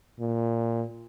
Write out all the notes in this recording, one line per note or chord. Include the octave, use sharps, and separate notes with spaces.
A#2